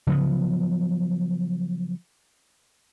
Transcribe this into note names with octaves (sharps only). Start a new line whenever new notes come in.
C#3 F3 F#3 B3